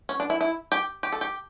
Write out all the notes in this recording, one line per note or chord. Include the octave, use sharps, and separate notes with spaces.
C#4
D4
E4
E4
G4
G4
A4
G4